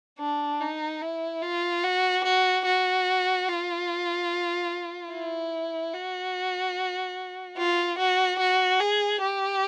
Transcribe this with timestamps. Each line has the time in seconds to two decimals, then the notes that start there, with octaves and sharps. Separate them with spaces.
0.19 D4
0.61 D#4
1.02 E4
1.42 F4
1.84 F#4
2.24 F#4
2.66 F#4
3.48 F4
5.12 E4
5.93 F#4
7.57 F4
7.99 F#4
8.39 F#4
8.80 G#4
9.21 G4